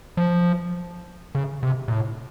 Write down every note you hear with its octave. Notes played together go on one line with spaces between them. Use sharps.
F3
C#3
C3
A#2
A2